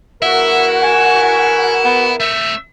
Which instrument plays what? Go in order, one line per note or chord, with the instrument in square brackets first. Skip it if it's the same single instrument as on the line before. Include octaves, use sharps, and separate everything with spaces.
[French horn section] E2 A#4 [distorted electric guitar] E4 [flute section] F#4 F#5 [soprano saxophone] E5
[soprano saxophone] G#5
B3
[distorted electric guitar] A3 C4 [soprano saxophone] E5